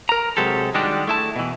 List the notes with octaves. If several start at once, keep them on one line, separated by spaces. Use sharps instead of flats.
A#4 A#5
C3 F#3 G#3 G4 A4
D#3 G3 G#3 D4 F#4 G4
A3 E4 A5
B2 E3